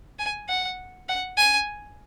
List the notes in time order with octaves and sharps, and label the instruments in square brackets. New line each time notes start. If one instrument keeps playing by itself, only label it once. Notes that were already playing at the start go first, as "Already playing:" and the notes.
[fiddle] G#5
F#5
F#5
G#5